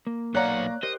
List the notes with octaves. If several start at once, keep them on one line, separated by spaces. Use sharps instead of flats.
A#3
B1 C#5 D5 F5 F#5 A#5 F#6
G4 A#4 C5 D#5